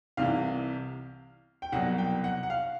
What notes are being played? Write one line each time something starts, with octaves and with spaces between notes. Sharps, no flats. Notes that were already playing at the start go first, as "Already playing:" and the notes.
C2 C3 E3 F5
G5
C2 B2 F#3 F#5
G5
F#5
F#5
F5